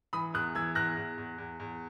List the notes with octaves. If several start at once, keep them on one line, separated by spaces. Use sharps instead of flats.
E3 B5 D#6
E2 D#6 F#6
E3 E6 G#6
E2 F#6 A#6
E2
E2
E2
E2